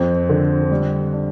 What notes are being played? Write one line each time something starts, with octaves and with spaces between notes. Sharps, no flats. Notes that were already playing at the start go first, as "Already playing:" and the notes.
Already playing: F2 C4
D3
G3
D4